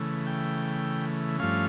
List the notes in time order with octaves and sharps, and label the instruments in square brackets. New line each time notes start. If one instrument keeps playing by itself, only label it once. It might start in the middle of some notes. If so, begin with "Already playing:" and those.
Already playing: [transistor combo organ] C#3 E3 A3
G5
G2 F3 A3 C#4 F5